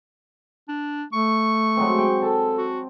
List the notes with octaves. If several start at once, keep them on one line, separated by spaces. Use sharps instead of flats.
D4
A3 C#6
F#3 G#3 C4
G5
A4 A5
F#4